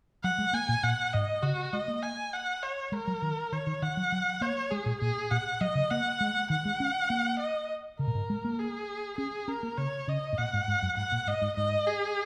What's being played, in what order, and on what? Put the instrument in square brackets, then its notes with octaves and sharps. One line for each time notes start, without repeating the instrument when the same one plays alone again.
[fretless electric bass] F#3 [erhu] F#5
[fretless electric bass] G#3
[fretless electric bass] A#3 [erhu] G#5
[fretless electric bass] A#2
[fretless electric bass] A#2 [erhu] F#5
[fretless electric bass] G#2 [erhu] D#5
[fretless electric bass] C#3 [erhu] F#4
[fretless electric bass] G#3 [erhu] D#5
[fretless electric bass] A#3
[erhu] G#5
F#5
C#5
[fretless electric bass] G#3 [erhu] A#4
[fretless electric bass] F#3
D#3
[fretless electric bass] D#3 [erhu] C#5
[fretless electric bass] D#3
[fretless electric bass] D#3 [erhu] F#5
[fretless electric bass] F#3
F#3
[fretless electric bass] A#3 [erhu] C#5
[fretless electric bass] G#3 [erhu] G#4
[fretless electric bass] A#2
[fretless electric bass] A#2 [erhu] G#4
[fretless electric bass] A#2 [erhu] F#5
[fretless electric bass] F#3 [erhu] D#5
[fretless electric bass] C#3
[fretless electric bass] A#3 [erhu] F#5
[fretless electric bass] G#3
[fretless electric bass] D#3 [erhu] F#5
[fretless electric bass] G#3
C#4
A#3
[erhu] D#5
[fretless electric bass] C#3 [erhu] A#4
[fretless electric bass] A#2
G#2
G#3
A#3
[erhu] G#4
[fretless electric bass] C#4 [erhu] G#4
[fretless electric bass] C#4 [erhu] A#4
[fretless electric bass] A#3
[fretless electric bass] C#3 [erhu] C#5
[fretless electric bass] C#3 [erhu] D#5
[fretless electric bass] G#2
[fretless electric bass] A#2 [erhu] F#5
[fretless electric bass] G#2
G#2
F#2
[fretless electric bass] G#2 [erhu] F#5
[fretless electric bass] A#2
[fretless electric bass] G#2 [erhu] D#5
[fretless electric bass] G#2
[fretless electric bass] G#2 [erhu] D#5
[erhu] G#4